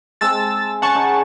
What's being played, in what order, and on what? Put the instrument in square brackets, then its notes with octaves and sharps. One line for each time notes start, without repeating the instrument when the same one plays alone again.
[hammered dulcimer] G#3 C4 [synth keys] A5 E6 A6
[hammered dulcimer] C#4 G#5 [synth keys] F#5 A5 C#6
[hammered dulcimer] C#3 D#4